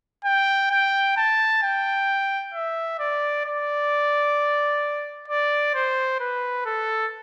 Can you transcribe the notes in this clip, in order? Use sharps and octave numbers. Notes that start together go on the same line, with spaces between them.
G5
G5
A5
G5
E5
D5
D5
D5
C5
B4
A4